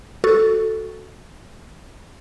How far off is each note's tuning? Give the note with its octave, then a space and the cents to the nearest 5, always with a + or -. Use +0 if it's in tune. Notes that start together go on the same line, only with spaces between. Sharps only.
F#4 -5 A4 +0